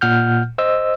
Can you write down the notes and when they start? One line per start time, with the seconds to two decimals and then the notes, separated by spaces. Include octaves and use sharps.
0.01 A#2 F#5 F6 G6
0.58 C5 D#5 E6